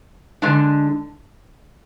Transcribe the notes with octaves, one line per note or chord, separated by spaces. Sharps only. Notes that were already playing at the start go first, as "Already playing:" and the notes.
D3 G#3 D4